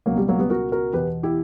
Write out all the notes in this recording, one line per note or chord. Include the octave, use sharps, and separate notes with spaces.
C#2 B2 F#3 A#3
G3
F#3 A#3
G3 B3
F#4 A#4
F#4 A#4
E2 B2 G4 B4
E4 G4